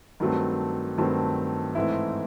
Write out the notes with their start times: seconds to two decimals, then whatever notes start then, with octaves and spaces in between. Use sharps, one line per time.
0.20 G2 D#3 F#3 A3 C4
0.98 G2 D#3 F#3 A3 C4
1.75 G#2 E3 A3 C4 E4